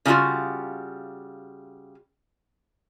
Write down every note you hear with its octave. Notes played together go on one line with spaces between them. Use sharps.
C#3 F#3 G3 A3 F4 F#4